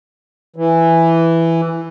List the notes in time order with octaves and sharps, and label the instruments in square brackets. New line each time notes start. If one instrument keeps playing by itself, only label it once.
[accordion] E3